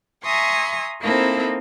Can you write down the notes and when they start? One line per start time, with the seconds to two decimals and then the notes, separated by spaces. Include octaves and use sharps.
0.24 E5 G#5 A#5 C6 C#6 D#6
1.01 A#3 C4 D#4 E4 A4